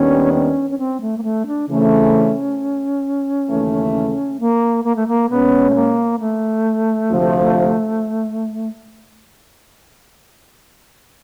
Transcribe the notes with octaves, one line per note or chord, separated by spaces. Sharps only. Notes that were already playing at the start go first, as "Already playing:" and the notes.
Already playing: D#2 D#3 G3 B3 C#4 D4
C#4
C#4
C4
A3
A#3
A3
D4
C#3 E3 A3 C4 C#4
D#2 C#3 E3 A3
A#3
A#3
A3
A#3
B2 G#3 B3 C#4
A3
A#3
A3
D2 C3 F3